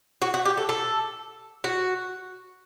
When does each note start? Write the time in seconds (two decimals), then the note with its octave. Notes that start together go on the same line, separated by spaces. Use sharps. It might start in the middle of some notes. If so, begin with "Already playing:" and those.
0.22 F#4
0.34 F#4
0.45 G4
0.57 A4
0.69 A4
1.64 F#4